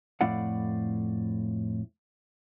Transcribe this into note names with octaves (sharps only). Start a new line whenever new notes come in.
F2 A2 E4 D5 F5 F#5